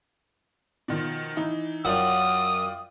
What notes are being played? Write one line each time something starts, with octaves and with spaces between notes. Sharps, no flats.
B2 D#3 F3
E3 D#4 E4
F#2 F4 D5 F#5 G5 D#6